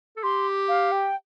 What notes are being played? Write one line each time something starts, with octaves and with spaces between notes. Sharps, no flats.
A4
G4 C6
F5
G5